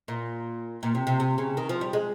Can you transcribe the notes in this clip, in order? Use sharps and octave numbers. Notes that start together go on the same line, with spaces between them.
A#2
A#2
C3
C3
C3
C#3
D#3
F3
G3
G#3